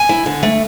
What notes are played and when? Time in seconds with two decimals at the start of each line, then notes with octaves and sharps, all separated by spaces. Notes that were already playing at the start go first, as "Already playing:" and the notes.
Already playing: G#5
0.09 E4
0.26 D3
0.43 A3